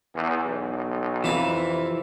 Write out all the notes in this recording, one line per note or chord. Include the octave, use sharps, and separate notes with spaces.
E2
B1
F2 C3 E3 F5